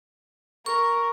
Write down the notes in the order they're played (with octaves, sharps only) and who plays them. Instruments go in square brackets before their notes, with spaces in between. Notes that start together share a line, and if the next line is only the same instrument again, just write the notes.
[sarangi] A#4 [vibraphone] C#6